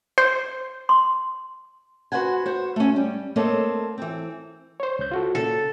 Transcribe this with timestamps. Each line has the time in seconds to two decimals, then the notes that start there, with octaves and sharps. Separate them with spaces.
0.18 C5
0.89 C6
2.12 F#4 B4 C5 F#5 G#5
2.46 F#4 C5
2.76 A3 C#4
2.96 G3
3.36 A3 A#3 C4 A4 C#5 D#5
3.98 E3 C4
4.80 C5 C#5
4.99 C#2 G6
5.11 F4 F#4 A4
5.35 A#2 C#3 A4